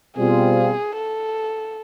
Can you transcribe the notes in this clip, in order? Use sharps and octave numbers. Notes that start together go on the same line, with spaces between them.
B2 G3 C4 F4 G#4
A4